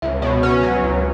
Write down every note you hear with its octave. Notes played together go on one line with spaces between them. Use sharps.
C#2 E5
B2 C#5
C#4 B4
F#3
C#2